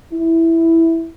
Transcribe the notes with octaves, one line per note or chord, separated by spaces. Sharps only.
E4